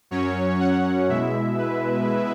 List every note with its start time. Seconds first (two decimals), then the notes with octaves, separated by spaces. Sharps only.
0.11 F#2 F#3 C#4 C#5
0.60 F#5
1.09 B2 G#3 E4 E5
1.58 B4